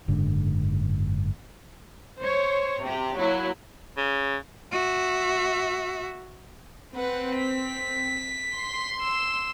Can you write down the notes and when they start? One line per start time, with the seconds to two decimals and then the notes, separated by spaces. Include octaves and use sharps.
0.08 F#1 G#2 D3
2.19 C5 C#5
2.82 C3 G4
3.16 F#3 A#3 E4
3.97 C#3
4.72 F#4 E5
6.95 C4 B4 F#5
7.36 B6
8.53 C6
9.01 E6